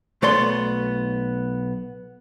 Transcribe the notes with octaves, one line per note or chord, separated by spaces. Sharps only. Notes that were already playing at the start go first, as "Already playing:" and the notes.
B1 A3 B3 C#5 D5 C6